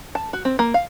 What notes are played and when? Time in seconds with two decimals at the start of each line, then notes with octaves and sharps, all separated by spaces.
0.15 A5
0.33 F#4
0.45 C4
0.59 A#3
0.74 F5